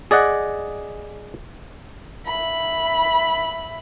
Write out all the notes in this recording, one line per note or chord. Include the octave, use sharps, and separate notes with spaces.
G#4 D5 D#5 F#5
E5 B5